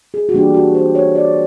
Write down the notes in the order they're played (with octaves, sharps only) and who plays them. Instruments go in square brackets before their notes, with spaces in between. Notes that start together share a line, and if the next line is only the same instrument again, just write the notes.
[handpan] G#4
F#4
E3 G3 A#3 D4 G4
F#4
C5
C#5
D5